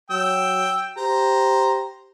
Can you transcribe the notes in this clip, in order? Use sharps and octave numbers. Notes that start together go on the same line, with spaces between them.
F#3 G5 E6
G4 C5 A#5